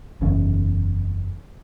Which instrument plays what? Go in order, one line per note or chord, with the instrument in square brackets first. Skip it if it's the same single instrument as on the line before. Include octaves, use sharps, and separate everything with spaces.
[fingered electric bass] F#1 E2 C#4